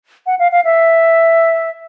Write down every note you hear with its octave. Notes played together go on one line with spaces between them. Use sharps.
F#5
F5
F5
E5